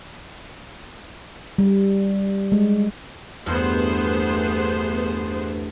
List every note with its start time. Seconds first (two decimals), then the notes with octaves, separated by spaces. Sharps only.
1.58 G3
2.52 G#3
3.46 E2 G2 A3 B3 G#4 C5 F#6 C#7